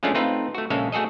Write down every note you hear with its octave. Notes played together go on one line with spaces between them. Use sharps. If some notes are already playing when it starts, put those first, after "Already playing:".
F3 G#3 A3 C#4 D4 F4
A3 C4 D#4 F4 B4
A3 F#4
A#1 C#3 G#3 A4 E5 F5
A3 F#4 G#4 A4 D#5